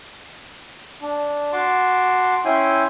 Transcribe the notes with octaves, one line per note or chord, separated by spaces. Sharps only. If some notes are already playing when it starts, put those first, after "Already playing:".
D4
F#4 A5 C6 D6
C#4 E4 G5 G#5 C6